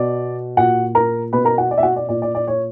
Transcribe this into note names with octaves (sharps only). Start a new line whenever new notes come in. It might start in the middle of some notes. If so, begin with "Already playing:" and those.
Already playing: B2 D5
A#2 F#4 F#5
A#4 A#5
B2 B4 B5
A#4 A#5
F#4 F#5
D5
E5
F#4 F#5
D5
A#2 D5
D5
D5
C#5